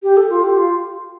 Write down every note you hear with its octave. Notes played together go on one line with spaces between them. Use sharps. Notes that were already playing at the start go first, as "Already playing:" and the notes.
G4
A4
F4
G4
F4